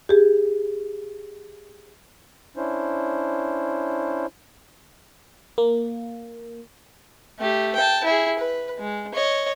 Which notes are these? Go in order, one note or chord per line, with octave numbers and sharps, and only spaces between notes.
G4 G#4
C#4 D4 E4 C5
A#3
A3 G4
G5 A5
E4 G#4
B4
G#3
C#5 D#5